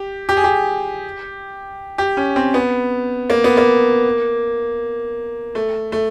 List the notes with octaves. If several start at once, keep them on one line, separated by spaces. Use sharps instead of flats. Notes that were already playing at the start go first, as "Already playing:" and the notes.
Already playing: G4
G4
G#4
G4
G4
C#4
C4
B3
A#3
B3
A#3
A3
A3